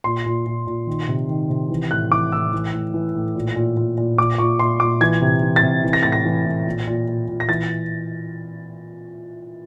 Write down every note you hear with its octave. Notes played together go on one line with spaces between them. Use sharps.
A#2 C6
A#2
A#2
A#2
D#3
C3
D#3
C3
E3
A2 F#6
E3 D6
A2 E6
E3
A2
E3
A2
A#2
A#2
A#2
A#2
A#2 D6
A#2 C#6
A#2 C6
A#2 D6
E3 G#6
C3
E3
A6
C3
E3
A#6
A2 A6
A#6
E3
A2
A#2
A#2
A#2
A#2
A#6
E3 A6